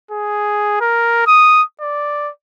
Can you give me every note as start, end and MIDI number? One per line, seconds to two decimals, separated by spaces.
0.11 0.77 68
0.81 1.27 70
1.27 1.62 87
1.81 2.30 74